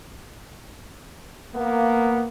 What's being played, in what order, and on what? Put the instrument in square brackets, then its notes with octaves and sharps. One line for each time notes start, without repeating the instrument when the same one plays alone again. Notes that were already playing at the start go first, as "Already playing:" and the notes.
[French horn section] A#3 [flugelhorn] B3